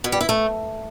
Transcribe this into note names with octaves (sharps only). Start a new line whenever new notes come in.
B2
G3
E4
A3